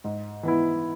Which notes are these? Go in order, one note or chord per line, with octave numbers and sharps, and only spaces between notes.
G#2
E3 B3 E4